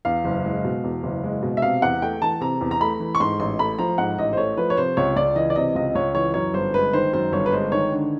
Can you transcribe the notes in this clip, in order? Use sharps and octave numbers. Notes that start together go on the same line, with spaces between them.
E2 F5
F#1
G#3
B2
E2
F#1
G#3
B2
E5
C3 F5
E2 F#5
A3 G5
E3 A5
C3 A#5
E2
A#5
A3 B5
E3
C#6
G#2 C6
A1 C6
A3 B5
F3 A#5
G#2 F#5
A1 D#5
C5
A3 C#5
F3 B4
C#5
C3 C5
C#2 C#5
C#2 D5
E3 D#5
D5
C3 D#5
C#2 D#5
C#2 C#5
E3 C#5
F#2 C#5
G1 C5
G#3 B4
D#3 C5
F#2 C5
G1 C#5
B4
G#3 C5
D#3 C#5
D3